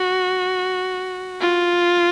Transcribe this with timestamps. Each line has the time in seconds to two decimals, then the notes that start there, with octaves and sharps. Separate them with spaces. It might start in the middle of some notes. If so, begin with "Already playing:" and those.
Already playing: F#4
1.42 F4